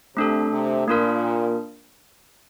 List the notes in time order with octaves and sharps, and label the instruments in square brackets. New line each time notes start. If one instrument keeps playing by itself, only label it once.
[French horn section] C3 [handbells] A3 D4 A4
[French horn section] C3
[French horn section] A#2 [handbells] A#3 D4 F4 A#4